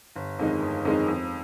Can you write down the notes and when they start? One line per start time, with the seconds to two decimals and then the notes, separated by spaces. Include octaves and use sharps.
0.16 G1
0.39 F2 D#3 G#3 D#4
0.62 G1
0.85 F2 D#3 G#3 D#4
1.08 F2